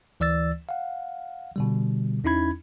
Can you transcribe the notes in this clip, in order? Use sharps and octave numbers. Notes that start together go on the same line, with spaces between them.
D2 E3 D5 E6 A6
F5 F#5
B2 D3 G3
E2 C#4 D#4 E4 B5 G#6